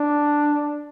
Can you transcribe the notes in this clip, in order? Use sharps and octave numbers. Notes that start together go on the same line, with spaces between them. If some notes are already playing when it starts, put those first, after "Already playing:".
Already playing: D4